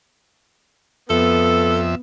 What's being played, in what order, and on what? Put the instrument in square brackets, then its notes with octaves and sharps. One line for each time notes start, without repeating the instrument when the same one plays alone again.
[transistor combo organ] F2 E5 [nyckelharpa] B3 [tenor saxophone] A4